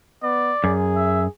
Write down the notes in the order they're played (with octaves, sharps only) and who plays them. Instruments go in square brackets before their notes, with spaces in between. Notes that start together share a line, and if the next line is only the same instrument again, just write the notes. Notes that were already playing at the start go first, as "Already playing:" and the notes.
[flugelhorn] B3 [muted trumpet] D5
[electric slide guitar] F#2 [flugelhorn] G#4
[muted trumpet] E5